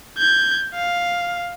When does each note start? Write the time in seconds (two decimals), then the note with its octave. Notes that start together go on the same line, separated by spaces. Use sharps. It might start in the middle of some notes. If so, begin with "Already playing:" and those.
0.18 G6 G#6
0.74 F5